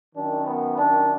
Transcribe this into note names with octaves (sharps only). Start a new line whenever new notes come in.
F#2 D#3 D4
B3
D4